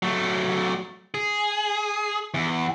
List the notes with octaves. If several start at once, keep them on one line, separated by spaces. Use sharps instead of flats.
F#3 A3
G#4
E2